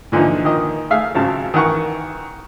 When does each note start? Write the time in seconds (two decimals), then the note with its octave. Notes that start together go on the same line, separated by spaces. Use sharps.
0.12 A#2 D3 E3 F3 D#4
0.45 D#3 D#5
0.90 A3 G#4 E5 F5
1.15 G#1 C#3 F#3 A5
1.54 D#3 E3 F#5 C#6